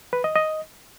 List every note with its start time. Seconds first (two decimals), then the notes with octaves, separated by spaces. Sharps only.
0.13 B4
0.24 D#5
0.35 D#5